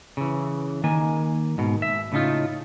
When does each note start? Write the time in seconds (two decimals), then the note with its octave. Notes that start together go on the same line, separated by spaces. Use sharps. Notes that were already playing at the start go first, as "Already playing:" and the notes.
0.17 C#3 E3
0.84 D#3 A#3 G#5
1.58 G#2 B2
1.82 E5
2.12 A2 C#3 A3 D#4 F4